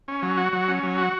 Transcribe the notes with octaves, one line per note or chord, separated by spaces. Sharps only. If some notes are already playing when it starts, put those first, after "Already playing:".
C#4
F#3
F#4
F#3
C#4
F#3
F#4